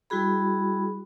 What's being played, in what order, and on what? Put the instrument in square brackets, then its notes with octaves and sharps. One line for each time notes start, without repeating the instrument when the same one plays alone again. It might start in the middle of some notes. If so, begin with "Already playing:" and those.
[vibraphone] G3 E4 F#4 G#4 B5